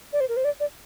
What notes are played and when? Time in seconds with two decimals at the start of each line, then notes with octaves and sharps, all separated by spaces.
0.13 D5
0.20 C5
0.29 A#4
0.37 C5
0.44 D5
0.60 D5